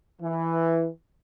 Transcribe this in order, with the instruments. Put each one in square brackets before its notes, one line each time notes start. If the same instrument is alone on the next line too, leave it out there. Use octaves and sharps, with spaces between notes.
[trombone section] E3